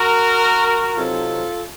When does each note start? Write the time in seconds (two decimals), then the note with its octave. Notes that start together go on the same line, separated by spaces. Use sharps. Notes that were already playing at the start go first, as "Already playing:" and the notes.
Already playing: F#4 A#4
0.95 C3 F#3 C4 D#4 F4 A4